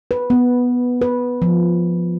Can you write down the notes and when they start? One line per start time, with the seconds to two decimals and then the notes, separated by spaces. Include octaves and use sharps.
0.11 B4
0.30 B3
1.02 B4
1.42 F3